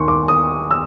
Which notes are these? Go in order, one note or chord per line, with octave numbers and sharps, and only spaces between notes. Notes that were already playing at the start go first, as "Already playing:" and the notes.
Already playing: D#2 D#3 C6 C#6
D6
D#6
E6